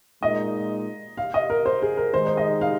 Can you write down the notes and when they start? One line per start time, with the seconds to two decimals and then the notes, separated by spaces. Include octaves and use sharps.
0.22 A#2 G#3 D#4 D#5
1.17 F5
1.34 D#5
1.50 A#4
1.66 C5
1.82 G#4
1.97 A#4
2.14 D#3 G#3 D#4 C5
2.27 C5
2.37 D#5
2.61 F5